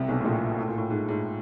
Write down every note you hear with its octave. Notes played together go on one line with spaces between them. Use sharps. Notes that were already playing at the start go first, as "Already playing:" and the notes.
Already playing: C2 C3
B1 B2
A2
A#1 A#2
A2
A#2
A2
G#2
G#2